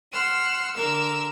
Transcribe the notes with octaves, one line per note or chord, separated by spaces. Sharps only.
F#5 C6 E6 F6
D3 A#4 D6 E6